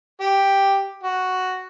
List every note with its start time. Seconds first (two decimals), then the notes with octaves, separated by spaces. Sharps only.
0.21 G4
1.03 F#4